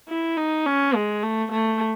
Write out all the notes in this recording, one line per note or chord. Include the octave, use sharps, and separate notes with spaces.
E4
D#4
C#4
G#3
A3
A3